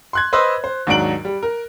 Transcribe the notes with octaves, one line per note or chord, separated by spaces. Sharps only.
C6 F#6 G#6
B4 C5 D#5 C6 E6
C5
D#2 G#2 F#3 D4 D7 F#7
G3
A#4